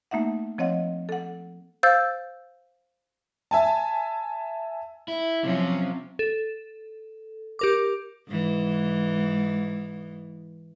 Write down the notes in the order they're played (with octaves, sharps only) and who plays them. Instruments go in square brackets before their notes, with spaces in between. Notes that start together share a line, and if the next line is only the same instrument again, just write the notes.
[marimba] A3 A#3 D#4 E5 F#5
F3 C4 C#5 D#5 F#5
A4 F#5
[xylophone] C5 F5 E6 G6 A6
[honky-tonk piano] E5 G#5 A5
[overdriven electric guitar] E4
[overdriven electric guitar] C3 [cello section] F3 F#3 C#4
[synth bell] A4
G4 A#4 D6
[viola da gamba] G#2 E3